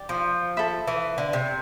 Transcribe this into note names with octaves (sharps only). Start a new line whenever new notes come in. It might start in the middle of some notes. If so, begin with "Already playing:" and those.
Already playing: G4 D5
F3
A4 E5 B5
E3
D3
C3